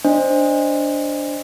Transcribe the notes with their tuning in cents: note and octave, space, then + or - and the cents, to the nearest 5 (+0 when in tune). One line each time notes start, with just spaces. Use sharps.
D4 -10 C5 +5 D#5 +0